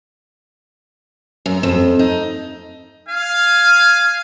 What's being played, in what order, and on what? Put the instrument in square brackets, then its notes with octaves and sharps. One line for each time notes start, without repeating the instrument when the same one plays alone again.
[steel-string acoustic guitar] F#2
F2
D#4
[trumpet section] F5 G#5